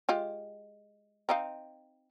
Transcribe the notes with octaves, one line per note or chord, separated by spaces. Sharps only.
G#3 F4 G4
C4 D#4 F5